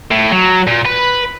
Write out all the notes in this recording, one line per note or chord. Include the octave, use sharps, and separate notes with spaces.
A2
F#3
A#2
B4